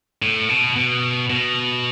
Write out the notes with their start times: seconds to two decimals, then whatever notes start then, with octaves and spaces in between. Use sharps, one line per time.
0.22 A2
0.49 B2
0.76 B2
1.30 B2